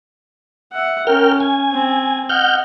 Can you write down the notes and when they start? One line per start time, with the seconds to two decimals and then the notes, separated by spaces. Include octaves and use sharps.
0.72 E5 F#5
1.07 C#4 A#4 G5 F6
1.41 G#5
1.72 C4
2.29 D#5 F#5 F6 G6